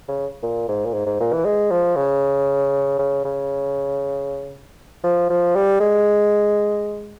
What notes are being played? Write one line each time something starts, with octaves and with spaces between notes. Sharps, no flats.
C#3
A#2
G#2
A#2
G#2
G#2
A#2
E3
G#3
F3
C#3
C#3
C#3
F3
F3
G3
G#3